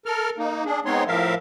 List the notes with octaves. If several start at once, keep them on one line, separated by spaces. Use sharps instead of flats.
A4 A#4 F6
A#3 D#4
D4 G#4
G#3 B3 C4 D#4 C#5 C6
A2 F3 A#4 E5 F5